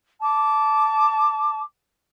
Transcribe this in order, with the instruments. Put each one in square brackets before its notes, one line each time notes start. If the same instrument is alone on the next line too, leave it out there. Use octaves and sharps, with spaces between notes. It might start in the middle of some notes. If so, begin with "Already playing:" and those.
[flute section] A5 D6